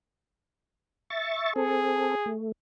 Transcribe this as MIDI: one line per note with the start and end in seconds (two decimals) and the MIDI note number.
1.10 1.53 76
1.10 1.53 85
1.10 1.53 93
1.56 2.15 60
1.56 2.32 68
1.56 2.15 69
2.26 2.52 57